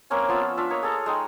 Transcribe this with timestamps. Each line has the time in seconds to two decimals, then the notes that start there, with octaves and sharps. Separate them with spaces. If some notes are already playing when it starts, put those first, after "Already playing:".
0.10 A#3 C4 C#4 G#5
0.29 F3 B3 F4 E5
0.57 D4 F4 E5
0.70 A#3 C#5 D#5
0.83 G#4 A4 A#5
1.06 G#3 D#4 G5